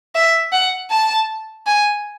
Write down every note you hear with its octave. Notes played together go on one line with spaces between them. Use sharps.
E5
F#5
A5
G#5